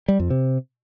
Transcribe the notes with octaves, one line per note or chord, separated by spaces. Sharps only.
G3
F2
C3